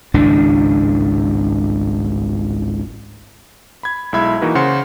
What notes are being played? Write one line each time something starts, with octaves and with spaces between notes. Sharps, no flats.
G#1 C#2 A2 D4
B5 G#6
B1 G#3 E4 E5 B5 G#6
E3 A#3 D#4 F#4 A#4 B4
C#3 C5 F#5 C6 C#7